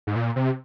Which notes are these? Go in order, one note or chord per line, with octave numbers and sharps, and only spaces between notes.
G#2
A#2
C3